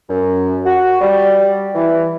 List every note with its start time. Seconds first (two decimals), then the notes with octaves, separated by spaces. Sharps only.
0.09 F#2
0.66 F#4
1.01 G3
1.75 E3